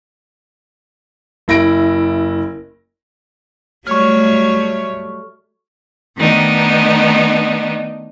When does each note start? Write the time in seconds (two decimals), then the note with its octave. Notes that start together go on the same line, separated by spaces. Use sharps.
1.48 F#1 E4 A#6 D7
3.87 F#3 G3 A3 C#5 C#6 F6
6.15 D#3 A3 B3 D4 D#4